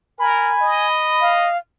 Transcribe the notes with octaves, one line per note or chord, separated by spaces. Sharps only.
A#4 G#5 B5
D#5
F5